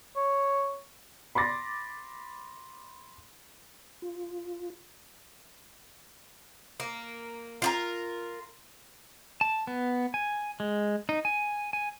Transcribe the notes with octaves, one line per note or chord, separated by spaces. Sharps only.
C#5
B5 C6 D6 A6 A#6
F4
A#3
F4 G4 A#4
A5
B3
G#5
G#3
D#4
G#5
G#5